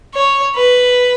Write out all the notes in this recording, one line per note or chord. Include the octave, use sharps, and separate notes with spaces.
C#5
B4